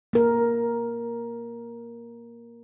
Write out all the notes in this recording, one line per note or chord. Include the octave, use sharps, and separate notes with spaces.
A#3 A#4